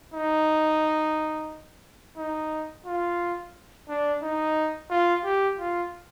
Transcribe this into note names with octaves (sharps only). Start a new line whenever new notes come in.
D#4
D#4
F4
D4
D#4
F4
G4
F4